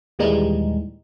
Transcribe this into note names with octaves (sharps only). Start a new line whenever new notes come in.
D#2 A#2 E3 G3 G#3 D#4